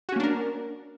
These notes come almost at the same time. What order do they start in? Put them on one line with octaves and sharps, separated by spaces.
F#4 C#4 A#3 D4 A#4